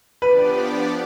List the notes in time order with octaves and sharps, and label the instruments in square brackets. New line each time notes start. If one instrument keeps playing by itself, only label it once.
[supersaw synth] F3 B3 D4 G4 D5 [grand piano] B4